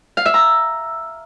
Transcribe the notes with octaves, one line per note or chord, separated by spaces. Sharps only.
F5
E5
A#5